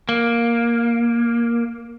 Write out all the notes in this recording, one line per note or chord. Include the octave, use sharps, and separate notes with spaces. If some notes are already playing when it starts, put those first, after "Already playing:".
A#3